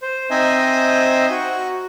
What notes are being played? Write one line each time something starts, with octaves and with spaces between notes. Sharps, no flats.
C5
C4 D#4 C5 D#5 E5 G#5
F#4